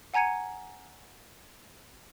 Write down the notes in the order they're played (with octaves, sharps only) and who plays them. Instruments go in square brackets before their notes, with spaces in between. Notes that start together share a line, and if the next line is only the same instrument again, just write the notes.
[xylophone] F#5 G#5 A#5 G#6 C#7 D#7